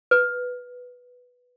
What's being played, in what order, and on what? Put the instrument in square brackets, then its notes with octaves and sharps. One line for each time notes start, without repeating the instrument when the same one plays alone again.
[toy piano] B4